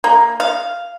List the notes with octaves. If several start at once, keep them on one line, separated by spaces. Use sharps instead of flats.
A#3
F5